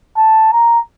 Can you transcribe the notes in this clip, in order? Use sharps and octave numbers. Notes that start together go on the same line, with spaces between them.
A5
A#5